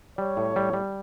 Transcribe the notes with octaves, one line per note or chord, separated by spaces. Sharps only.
G3 C#5
A2
G3
G3